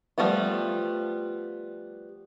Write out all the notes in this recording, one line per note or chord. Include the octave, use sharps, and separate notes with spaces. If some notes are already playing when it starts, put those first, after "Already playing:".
F3 G3 A3 B3 F4